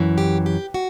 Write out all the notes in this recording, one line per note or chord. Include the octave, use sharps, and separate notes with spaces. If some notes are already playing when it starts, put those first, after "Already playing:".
Already playing: F#2 E3
G4
G4
F#4